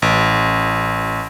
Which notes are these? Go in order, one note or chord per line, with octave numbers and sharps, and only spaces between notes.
A1